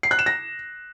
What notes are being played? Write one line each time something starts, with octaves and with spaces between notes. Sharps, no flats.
C7
F#6
E7
A#6